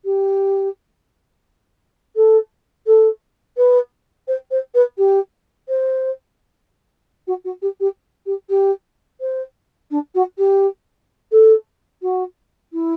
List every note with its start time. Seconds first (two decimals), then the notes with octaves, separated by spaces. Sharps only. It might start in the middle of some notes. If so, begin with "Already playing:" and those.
0.05 G4
2.16 A4
2.86 A4
3.57 B4
4.28 C5
4.51 C5
4.74 B4
4.98 G4
5.68 C5
7.27 F#4
7.44 F#4
7.62 G4
7.80 G4
8.26 G4
8.49 G4
9.20 C5
9.90 D4
10.15 F#4
10.38 G4
11.32 A4
12.02 F#4
12.73 E4